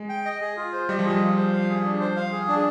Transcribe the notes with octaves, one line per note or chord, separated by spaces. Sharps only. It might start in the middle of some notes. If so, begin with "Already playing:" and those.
Already playing: G#3
G5
D#5
G#4
F4
C5
G3 D#5
F3
G#4
G3
F4
C5
F5
G#4
D4
C5
F5
G#4
D4